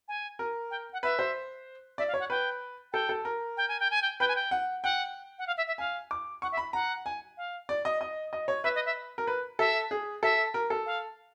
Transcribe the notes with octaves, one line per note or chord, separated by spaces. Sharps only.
G#5
A#4
G5
F#5
B4 E5
C5
D5 E5
F5
C#5
F#5
B4 G5
A4 G5
A4
A#4
G5
G#5
G5
G#5
G5
B4 G5
G#5
G5
F#5
F#5 G5
F#5
F5
E5
E5
F5 G#5
D6
F#5 C#6
E5
B5
F#5 A#5
G#5
F5
D5
D#5
D#5
D#5
C#5
B4 E5
D#5
E5
A#4
B4
A4 E5
G#4
A4 E5
A#4
A4
F5